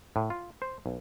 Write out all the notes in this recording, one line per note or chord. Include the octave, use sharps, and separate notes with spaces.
A2
F4
C5
B1